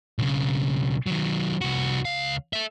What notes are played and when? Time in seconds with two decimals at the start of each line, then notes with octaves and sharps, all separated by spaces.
0.19 B1 C#3
1.06 D#3 F#3
1.61 C2 F#4
2.05 C#2 F5
2.53 A4 E5